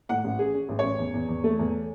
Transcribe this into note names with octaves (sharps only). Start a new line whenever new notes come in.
A2 F#5
A1
C#4 G#4
C#4
A1
A1 C#5
E2
E2
E2
A3
E2